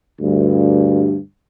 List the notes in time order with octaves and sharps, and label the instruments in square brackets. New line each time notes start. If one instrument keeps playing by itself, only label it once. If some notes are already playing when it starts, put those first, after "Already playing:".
[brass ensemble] D2 G2